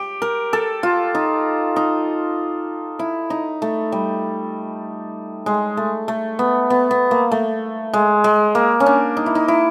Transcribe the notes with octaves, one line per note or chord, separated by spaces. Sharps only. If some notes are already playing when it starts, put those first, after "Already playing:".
Already playing: G4
A#4
A4
F4
D#4
D#4
E4
D#4
A3
G3
G#3
A3
A3
B3
B3
B3
A#3
A3
G#3
G#3
A#3
C#4
D4
D#4
E4
D#4
E4